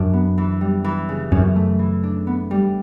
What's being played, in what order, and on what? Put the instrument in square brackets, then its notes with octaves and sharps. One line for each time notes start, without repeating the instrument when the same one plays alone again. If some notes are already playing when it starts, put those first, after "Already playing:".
Already playing: [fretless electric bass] F#2 [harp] D4
[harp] B3
E3
G3
E3
C#3
[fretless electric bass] F#2 [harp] C#4
[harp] A3
E3
D4
B3
G3